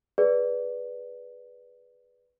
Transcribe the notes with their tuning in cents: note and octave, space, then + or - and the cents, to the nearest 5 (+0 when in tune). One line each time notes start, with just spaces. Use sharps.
G#4 +0 B4 +0 D5 +0